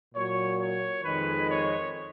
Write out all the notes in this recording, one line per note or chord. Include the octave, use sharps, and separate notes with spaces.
A#2 F#3 C#5
C#5
F2 D#3 G#3 B4
C#5